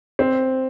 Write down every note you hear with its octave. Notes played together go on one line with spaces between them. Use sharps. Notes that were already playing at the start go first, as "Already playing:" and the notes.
C4